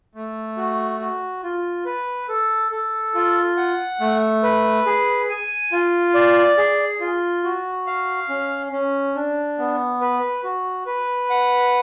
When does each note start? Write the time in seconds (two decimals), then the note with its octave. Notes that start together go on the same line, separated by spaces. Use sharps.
0.15 A3
0.57 F#4
1.00 F#4
1.43 F4
1.85 B4
2.29 A4
2.72 A4
3.15 F4
3.57 F#5
4.00 A3
4.43 B4
4.86 G#4
5.29 G#5
5.72 F4
6.14 D5
6.58 G#4
7.00 F4
7.44 F#4
7.87 F5
8.29 C#4
8.72 C#4
9.15 D4
9.58 B3
10.01 B4
10.44 F#4
10.86 B4
11.30 F#5